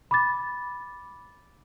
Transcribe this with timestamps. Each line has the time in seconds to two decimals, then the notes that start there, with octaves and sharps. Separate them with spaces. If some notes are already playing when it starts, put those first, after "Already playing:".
0.11 B5 D6 A6